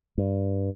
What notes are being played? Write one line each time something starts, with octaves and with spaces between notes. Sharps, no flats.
G2